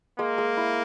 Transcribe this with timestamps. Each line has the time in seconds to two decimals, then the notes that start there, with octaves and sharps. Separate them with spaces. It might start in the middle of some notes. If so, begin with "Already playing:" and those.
0.19 G#3 A#3
0.38 G#3
0.57 E4